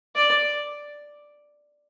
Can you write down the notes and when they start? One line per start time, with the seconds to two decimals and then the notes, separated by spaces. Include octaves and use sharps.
0.16 D5